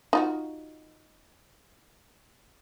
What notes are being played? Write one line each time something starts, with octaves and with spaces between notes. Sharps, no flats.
D#4 F4 F#4